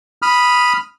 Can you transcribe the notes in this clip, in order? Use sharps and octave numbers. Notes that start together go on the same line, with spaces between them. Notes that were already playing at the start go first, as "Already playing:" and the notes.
B5 D#6 F6